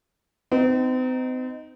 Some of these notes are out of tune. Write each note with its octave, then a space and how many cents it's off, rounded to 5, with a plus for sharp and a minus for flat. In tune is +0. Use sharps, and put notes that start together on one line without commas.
C4 -40 D#4 +0